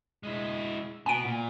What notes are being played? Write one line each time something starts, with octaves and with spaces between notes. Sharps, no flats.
G#3 E4
B3 F#4 G#5 D7
A#2